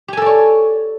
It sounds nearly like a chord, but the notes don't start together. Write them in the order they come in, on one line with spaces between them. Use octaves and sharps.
G4 G#5 A4 D5 C#5